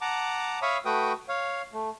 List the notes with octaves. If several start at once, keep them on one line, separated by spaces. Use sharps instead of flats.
F#5 A5 A#5 D6
C#5 E5 F5 B5 C#6 D#6
A3 F#4 B4 G5 D#6
C#5 F5
A3